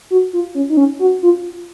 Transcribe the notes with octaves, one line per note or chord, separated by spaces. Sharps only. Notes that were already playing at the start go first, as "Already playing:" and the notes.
F#4
F4
C#4
D#4
C#4
F#4
F4